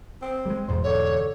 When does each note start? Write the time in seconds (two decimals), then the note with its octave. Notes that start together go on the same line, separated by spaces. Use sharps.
0.22 C4
0.46 G3 G#3
0.68 E2 G#2 B2 C5
0.84 D3 C#5